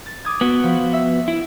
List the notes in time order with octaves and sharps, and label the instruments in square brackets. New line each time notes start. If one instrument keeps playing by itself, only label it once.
[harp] A6
D6 D#6 G#6
[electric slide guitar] B3 F#4
[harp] F3
E5
[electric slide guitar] E4